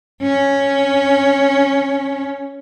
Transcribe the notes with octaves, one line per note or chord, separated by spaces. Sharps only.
C#4